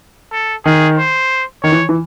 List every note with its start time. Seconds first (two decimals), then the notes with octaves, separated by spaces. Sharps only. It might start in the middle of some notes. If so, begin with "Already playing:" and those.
0.32 A4
0.65 D#3 G#4
0.98 C5
1.63 D#3 C#5
1.72 E3
1.89 E3